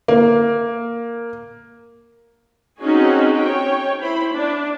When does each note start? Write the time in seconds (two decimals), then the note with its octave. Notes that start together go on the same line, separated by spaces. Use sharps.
0.08 A#3
2.81 C4 C#4 D#4 F#4 G#4
3.38 C#5 G5
4.01 E4 C5 B5
4.33 D4